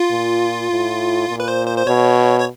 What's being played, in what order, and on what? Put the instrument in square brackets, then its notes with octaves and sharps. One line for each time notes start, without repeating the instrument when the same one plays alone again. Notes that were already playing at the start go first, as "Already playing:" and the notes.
Already playing: [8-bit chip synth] F4
[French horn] A#2
A2
A#2
[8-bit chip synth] B4
C5
C5
C5
[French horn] B2 [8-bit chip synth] C#5
[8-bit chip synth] C#5